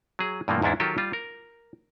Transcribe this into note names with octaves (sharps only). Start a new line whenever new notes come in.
F#3 G#4
G2 B2 E3 F3 A3 A#3
E2 G#2 C#4 D4 E4
D#3 F#3 F4 G4 A4 A#4
G3 F4
A#4